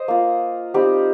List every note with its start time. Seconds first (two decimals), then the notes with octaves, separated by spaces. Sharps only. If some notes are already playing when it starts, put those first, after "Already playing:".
Already playing: C5 D#5
0.08 A#3 F4
0.74 G3 C4 D#4 G4